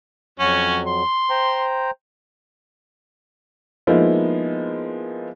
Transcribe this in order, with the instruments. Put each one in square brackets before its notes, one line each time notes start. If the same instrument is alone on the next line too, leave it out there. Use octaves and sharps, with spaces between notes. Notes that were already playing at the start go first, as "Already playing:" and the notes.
[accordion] F2 F#3 [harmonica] C#4 F#4
[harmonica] C6
[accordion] C5 G5 A#5
[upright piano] F3 G#3 A#3 B3 D#4 E4